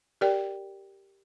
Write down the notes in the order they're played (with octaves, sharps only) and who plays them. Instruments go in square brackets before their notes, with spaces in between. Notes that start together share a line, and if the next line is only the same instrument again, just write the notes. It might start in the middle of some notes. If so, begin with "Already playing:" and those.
[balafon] G4 A#4 D5 G5